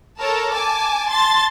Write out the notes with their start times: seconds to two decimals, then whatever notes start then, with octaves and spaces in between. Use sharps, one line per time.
0.20 A4 A#4 C#5 A5
0.52 G#5 A5 D6
1.11 A5 C6 A6